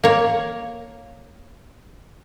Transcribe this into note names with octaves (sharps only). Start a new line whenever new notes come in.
A#3 C#5